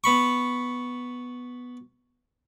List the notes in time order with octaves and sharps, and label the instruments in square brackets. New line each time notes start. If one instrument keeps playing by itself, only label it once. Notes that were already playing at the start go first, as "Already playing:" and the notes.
[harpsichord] B3 B5 C#6